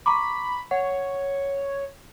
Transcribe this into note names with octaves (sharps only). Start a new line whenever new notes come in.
A#5 B5 C#6 D6
C#5 F#5